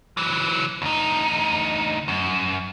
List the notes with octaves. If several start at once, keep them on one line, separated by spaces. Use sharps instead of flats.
E3 F#3
D2 D#4
F#2